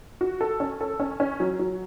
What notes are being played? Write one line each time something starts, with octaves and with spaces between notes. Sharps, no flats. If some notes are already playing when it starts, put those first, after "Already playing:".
F#4
A4
C#4
A4
C#4
C#4
F#3
F#3